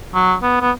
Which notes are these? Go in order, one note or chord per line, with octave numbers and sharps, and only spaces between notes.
F#3
B3
B3